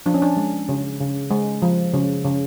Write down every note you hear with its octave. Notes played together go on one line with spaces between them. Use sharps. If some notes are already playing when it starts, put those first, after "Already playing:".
F3 D4
C#4
D4
G#3
C#3
C#3
G#3
F3
C#3
C#3